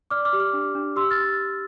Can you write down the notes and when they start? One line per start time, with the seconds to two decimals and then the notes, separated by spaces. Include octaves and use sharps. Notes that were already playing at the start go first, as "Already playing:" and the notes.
0.10 D5 D6 F6
0.25 D6 F6
0.33 G4
0.40 D6 F6
0.53 D4
0.75 D4
0.96 G4 C6 E6
1.11 F6 A6